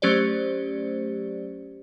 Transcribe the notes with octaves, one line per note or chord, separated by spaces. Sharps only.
F#3 A3 C#4 G4 C5 D5